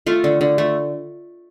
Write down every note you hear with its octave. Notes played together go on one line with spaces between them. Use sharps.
A3 F4 A4
D3
D3
A3